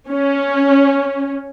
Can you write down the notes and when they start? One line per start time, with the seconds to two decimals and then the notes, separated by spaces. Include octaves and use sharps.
0.11 C#4